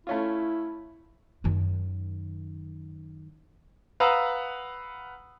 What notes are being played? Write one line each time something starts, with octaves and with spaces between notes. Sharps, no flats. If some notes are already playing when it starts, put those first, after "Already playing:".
A3 C#4 E4 F4
F#2 D#3
B4 F5 F#5 A#5 D#6 E6